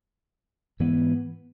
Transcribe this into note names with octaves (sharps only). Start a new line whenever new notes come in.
G#2 E3 B3